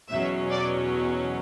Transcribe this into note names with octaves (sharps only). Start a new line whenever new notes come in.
E2 B2 F#3 C#4 E5
D5